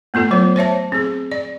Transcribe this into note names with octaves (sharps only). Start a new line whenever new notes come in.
A3 B3 F4 A4
F#3 C5
C5 C#5 E5 A5
C4 G#4
D5